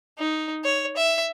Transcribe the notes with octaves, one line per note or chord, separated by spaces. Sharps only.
D#4
C#5
E5